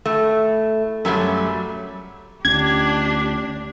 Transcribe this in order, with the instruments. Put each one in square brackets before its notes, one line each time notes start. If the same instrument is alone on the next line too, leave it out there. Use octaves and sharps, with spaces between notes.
[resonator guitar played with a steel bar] A2 A3
F#2 F#3 G3 A3
[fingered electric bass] D2 C#4 [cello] D4 G4 [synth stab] G#6